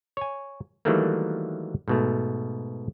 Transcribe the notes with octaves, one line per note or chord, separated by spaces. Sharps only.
C#5 G#5
D#3 E3 F#3 G3 A3 A#3
G#2 B2 A3